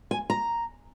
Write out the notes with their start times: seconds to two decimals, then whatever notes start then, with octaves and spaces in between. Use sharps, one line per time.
0.11 G#5
0.30 A#5